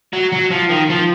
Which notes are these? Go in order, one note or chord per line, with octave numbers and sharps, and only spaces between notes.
F#3
F#3
F3
D#3
F3